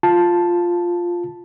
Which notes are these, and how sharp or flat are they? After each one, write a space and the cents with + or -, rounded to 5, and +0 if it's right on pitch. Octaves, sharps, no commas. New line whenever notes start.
F4 +0 A5 +0